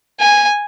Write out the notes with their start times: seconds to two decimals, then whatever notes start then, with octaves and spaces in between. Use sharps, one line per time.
0.19 G#5